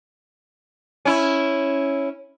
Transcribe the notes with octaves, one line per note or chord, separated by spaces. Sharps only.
C#4 E4